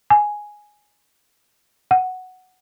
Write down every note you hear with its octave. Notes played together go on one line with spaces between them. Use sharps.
G#5
F#5